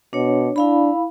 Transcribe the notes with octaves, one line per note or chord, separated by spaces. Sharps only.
B2 D4 C#5
D4 E4 F5 B5